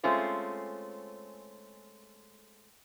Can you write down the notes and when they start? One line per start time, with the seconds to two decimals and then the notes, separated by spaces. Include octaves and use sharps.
0.04 G#3 A3 C4 C#4 F4 C5